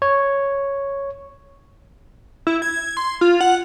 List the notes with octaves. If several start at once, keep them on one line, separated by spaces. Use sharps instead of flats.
C#5
E4
G#6
C6
F4
F#5